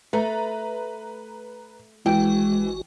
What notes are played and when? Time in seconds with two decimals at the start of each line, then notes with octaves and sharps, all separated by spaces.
0.13 A3 B4 A#5
2.06 G#1 E3 G#3 F#4 G5